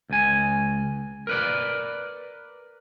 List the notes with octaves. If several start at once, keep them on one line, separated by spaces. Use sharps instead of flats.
C#2 G#5
A#4 B4 D5